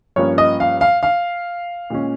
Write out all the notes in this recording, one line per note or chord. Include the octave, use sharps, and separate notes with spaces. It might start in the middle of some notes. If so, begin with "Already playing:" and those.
G2 F3 A#3 C#4 C#5
D#5
F5
F5
F5
A#2 G#3 C#4